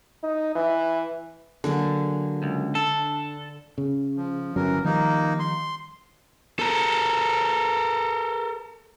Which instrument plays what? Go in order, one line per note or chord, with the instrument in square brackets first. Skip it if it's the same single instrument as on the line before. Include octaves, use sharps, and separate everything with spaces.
[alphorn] D#4
E3
[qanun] D3 [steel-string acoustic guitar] F#3 A#3 G#4
[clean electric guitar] C#2
[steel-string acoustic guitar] D4 [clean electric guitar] A4
[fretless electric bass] C#3
[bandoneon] F3
[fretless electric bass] G1 F#3 C#4 [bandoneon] E3 A#4
[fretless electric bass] D#3 F3 G3 [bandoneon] A#3 D#4
[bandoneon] C6
[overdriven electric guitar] A4 A#4